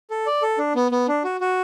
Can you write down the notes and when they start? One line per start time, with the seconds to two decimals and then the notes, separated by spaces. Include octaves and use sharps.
0.10 A4
0.26 D5
0.42 A4
0.58 D4
0.75 B3
0.92 B3
1.08 D4
1.24 F#4
1.41 F#4